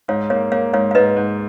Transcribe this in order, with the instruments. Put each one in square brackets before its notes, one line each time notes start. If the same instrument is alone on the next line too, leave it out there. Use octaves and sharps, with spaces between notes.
[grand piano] G#2 [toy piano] C#5 F5
[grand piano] A#3 [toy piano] C#5 F5
[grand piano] A#3 [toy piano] C#5 F5
[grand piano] G#2 [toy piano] C#5 F5
[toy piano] F5
[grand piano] G#2 [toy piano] B4 D#5
[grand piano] G#2